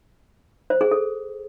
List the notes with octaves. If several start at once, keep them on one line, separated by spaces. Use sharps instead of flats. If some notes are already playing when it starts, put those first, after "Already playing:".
C5
G#4
A4